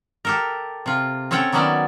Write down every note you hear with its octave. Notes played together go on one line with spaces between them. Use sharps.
G4 A4 A#4
C3 F4
C4 C#4 A4 C#5 F#5 G5
D#3 F#3 B3 C#4 D5 E5